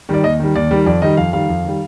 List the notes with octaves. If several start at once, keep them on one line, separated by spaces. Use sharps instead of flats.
D#3 G3 D5
D#2 D#5
D#3 G3
D#2 D5
D#3 G3
F2 D5
D#3 G3 D#5
F2 F5
D#3 G3 F5
F2
D#3 G3